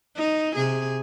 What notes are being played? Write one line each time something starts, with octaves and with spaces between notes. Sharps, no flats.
D#4
C3 G#4